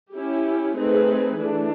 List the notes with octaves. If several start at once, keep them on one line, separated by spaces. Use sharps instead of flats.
C#4 E4 G4
A3 C4 D#4 G#4 B4
E3 A3 D4